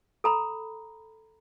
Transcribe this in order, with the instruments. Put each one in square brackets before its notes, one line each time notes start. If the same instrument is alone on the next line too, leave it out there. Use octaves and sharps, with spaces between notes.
[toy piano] A4 A#5 B5